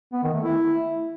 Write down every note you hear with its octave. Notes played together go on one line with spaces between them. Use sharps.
B3
D#3
A3
E4